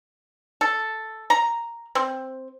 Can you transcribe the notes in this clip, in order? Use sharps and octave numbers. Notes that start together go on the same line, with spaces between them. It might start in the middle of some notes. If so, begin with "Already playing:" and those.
A4
A#5
C4